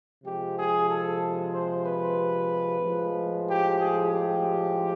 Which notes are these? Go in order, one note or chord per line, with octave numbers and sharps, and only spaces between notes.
C3 F3 G#3 G4
G#4
A4
C5
B4
A2 F3 G#3
G4
G#4
G4